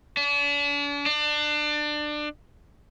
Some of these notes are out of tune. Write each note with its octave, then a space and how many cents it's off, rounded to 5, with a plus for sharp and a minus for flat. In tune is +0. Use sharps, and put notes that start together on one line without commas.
D4 -40
D4 +25